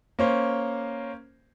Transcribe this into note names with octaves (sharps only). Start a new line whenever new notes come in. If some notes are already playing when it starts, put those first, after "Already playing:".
A#3 C#4 C5